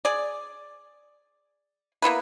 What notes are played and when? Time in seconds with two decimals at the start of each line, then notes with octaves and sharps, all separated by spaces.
0.05 G#4 D5
2.02 A#3 B3 E4 B4